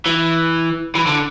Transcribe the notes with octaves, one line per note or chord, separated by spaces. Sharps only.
E3
E3
D3